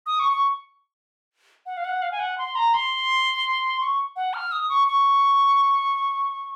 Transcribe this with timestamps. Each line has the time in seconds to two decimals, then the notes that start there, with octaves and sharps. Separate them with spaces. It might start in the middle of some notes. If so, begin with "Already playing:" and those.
0.06 D#6
0.19 C#6
0.33 C#6
1.66 F#5
1.77 F5
1.85 F#5
2.02 F5
2.12 G#5
2.20 F#5
2.38 C6
2.55 A#5
2.74 C6
3.80 C#6
4.16 F#5
4.34 F6
4.52 D#6
4.69 C#6
4.87 C#6